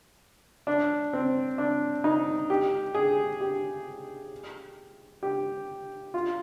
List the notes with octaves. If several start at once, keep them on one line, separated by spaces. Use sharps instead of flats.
D4
C4
D4
D#4
G4
G#4
G4
G4
F4